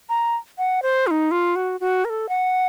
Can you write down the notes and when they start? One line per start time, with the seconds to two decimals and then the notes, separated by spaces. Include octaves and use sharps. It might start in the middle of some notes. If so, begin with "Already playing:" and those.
0.09 A#5
0.58 F#5
0.82 C5
1.07 F4
1.11 D#4
1.31 F4
1.56 F#4
1.80 F#4
2.05 A#4
2.10 A4
2.29 F#5